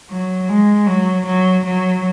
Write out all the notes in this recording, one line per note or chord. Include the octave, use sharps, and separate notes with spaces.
F#3
G#3
F#3
F#3
F#3